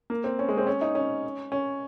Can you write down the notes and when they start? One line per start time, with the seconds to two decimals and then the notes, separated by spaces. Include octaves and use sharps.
0.10 A#3
0.24 C4
0.39 C#4
0.49 G#3
0.58 C4
0.67 C#4
0.81 D#4
0.95 C#4
1.52 C#4